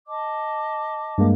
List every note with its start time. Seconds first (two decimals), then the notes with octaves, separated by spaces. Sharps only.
0.07 D#5 A5 D6
1.18 G2 G#3 A#3